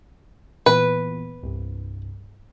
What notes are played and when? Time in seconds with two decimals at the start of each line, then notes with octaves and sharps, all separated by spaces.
0.66 A#2 E3 B3 B4
1.43 C2 G2